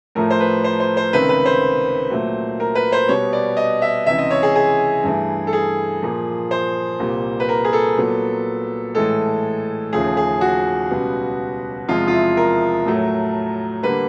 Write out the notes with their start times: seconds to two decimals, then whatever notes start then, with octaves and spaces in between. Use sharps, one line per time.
0.15 A2 F3 A3 A#4
0.30 C5
0.40 B4
0.64 C5
0.80 C5
0.97 C5
1.13 C#2 C3 D#3 B4
1.29 B4
1.46 C5
2.11 A#2 F#3 A3
2.60 A#4
2.75 B4
2.92 C5
3.09 B2 G3 B3 C#5
3.33 D5
3.57 D#5
3.82 E5
4.06 C#2 C3 E3 E5
4.18 D#5
4.31 C#5
4.43 G#4
4.56 G#4
5.04 G2 E3 A3
5.47 A4
5.53 G#4
6.02 A#2 F3 A#3
6.51 C5
7.00 C2 A#2 G3
7.40 B4
7.49 A#4
7.65 G#4
7.73 A4
7.98 A#2 F#3 B3
8.95 A2 E3 G#3 A4
9.92 D#2 C#3 F3 A3 G#4
10.17 G#4
10.41 F#4
10.90 C#2 B2 G3 B3
11.88 E2 C3 F3 G#3 F4
12.08 F4
12.13 E4
12.37 A#4
12.86 A2 F#3 A3
13.83 D3 G3 A#3 B4